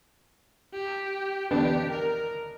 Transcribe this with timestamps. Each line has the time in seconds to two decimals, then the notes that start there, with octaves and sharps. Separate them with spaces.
0.73 G4
1.51 B3 D4 G4
1.90 A#4